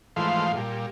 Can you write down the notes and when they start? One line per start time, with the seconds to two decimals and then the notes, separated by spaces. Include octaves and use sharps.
0.16 G#2 E3 F3 A3 F5 C6
0.56 A#2 G3